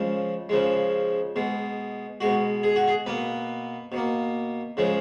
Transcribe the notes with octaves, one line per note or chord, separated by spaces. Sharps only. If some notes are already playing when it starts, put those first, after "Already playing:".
Already playing: C#3 F3 G#3
C#3 F3 G#3
B2 G#3
B2 G#3 F#4
G#4
F#4
G#4
B2 A#3 B4
B2 A#3
C#3 F3 G#3